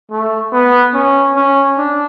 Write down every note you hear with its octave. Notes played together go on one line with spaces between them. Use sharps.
A3
B3
C#4
C#4
D4